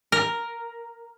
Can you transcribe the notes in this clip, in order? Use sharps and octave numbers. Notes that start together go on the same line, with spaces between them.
A#4